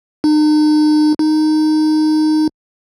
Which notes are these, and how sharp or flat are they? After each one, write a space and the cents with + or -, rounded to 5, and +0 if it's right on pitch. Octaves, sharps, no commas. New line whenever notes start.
D#4 -40
D#4 -10